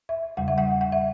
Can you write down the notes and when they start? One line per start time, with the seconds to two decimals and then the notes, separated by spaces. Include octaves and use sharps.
0.09 E5
0.37 E2 C#3 G3 F#5
0.48 E5
0.58 F#5
0.81 F#5
0.92 E5